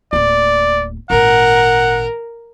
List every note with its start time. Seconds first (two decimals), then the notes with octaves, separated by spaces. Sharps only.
0.13 D1 A#3 D5
1.10 G#1 A#2 A#4 F#5